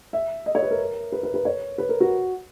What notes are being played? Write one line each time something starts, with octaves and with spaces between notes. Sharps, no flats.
E5
D#5
C#5
B4
A#4
B4
B4
B4
C#5
B4
A#4
F#4